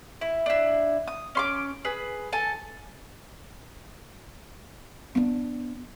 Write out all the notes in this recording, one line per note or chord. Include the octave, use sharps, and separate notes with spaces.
E4
D4 E4
D#6
C#4 C6 D6
G#4 B4
A4 G#5 A5
B3 D4